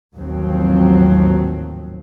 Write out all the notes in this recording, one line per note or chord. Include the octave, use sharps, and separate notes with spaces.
A1 D#2 G#2 F3 F#3 C4